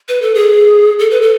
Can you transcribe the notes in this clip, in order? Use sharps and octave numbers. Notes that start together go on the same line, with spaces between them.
B4
A4
G#4
A4
B4
A4